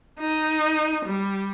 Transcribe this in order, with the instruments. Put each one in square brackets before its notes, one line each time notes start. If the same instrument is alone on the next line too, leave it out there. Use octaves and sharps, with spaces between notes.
[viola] D#4
G3